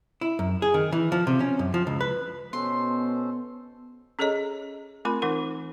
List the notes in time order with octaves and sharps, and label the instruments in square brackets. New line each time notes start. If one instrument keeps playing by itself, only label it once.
[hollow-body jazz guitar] E4
F#2
G#4
D#3
E3
F3
C3
C#4
F#2
F3
C#2
B4
[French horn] B2 [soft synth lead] B3 [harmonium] C#4 A4 C5 [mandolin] C6
[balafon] C#4 G#4 A4 C#5 D#5 A#5
A3 C4 F4 A#4 B5 C6
E3 D#4 A#4 F#5